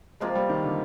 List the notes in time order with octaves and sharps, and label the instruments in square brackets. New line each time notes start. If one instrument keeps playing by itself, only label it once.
[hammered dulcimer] C3 F3 A#3 F4 [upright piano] G#3
[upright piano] G3
D#3
D3